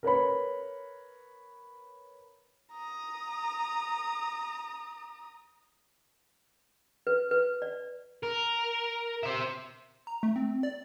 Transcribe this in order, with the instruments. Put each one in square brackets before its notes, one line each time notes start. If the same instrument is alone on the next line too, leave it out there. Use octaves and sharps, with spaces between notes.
[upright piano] A#4 B4 C#5 B5
[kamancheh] A#5 D#6
[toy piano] B4
B4
D5
[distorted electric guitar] A#4
C5 E5
[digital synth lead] A#5
A3
C4
D5